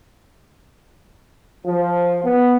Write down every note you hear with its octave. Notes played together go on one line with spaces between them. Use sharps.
F3
B3